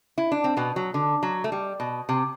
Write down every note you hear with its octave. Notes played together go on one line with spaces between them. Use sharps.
E4
D4
C4
B2 B3
F#3
D3
F#3
A3
G3
B2
C3